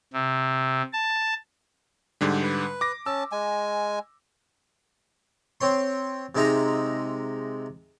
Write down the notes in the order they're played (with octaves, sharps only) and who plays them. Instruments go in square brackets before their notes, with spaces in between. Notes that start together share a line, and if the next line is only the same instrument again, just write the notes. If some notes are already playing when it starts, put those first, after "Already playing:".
[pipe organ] C3
A5
[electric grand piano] G#2 D3 G3
[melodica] B4
[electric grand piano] D6 A#6
[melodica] C#4 A5 [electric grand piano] E6
[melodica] G#3 G#5
[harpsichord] C4 C#5 C6
C3 G#3 D#4 E5 A#5